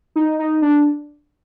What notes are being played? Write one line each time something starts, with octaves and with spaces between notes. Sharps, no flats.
D#4
D#4
D4